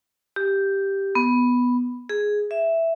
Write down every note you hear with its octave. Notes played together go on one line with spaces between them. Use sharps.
G4
B3
G#4
E5